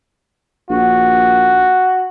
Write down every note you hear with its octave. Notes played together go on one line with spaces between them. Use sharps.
A#1 F#4